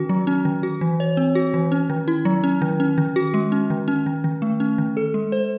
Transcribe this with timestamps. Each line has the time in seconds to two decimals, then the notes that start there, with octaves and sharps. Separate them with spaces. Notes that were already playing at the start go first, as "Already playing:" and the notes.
Already playing: D#3 C#4 F#4
0.09 F#3
0.27 C#4
0.45 D#3
0.63 F#4
0.81 E3
1.00 C#5
1.17 C4
1.35 F#4
1.54 E3
1.72 C#4
1.90 D#3
2.08 E4
2.25 F#3
2.44 C#4
2.62 D#3
2.80 C#4
2.98 D#3
3.16 F#4
3.34 G#3
3.52 C#4
3.70 D#3
3.88 C#4
4.06 D#3
4.24 D#3
4.42 A3
4.60 C#4
4.78 D#3
4.97 A4
5.14 G#3
5.32 C5